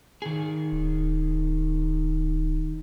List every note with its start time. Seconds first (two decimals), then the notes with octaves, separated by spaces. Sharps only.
0.22 D#3 G#4
0.72 D1